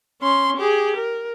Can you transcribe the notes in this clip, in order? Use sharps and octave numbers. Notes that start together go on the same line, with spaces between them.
C#4 C6
G4 G#4
A#4